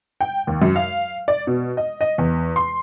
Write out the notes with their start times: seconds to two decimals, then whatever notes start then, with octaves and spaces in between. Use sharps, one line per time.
0.21 G5
0.47 D#2
0.62 F#2
0.76 F5
1.28 D5
1.47 B2
1.77 D#5
2.01 D#5
2.18 E2
2.56 C6